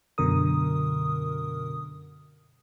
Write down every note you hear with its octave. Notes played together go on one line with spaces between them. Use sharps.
F#2 B2 D3 A#4 D#6